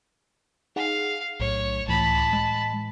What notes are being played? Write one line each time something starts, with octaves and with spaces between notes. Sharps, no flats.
D#4 G#4 F5 F#5
B1 A2 C#5
C#2 A2 E3 A5 B5
G#3